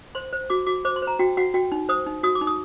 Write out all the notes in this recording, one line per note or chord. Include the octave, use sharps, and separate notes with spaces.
C5 C6
C5
F#4 D6
F#4 D6
C5 D6
C6
C5
A#5
F#4 G5
F#4 F#5
F#4 G5
D#4
C5 D#6
D#4
F#4 D#6
D6
D#4
D#6